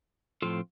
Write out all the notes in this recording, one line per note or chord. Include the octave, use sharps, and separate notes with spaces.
A2 F3 C4 F4 A4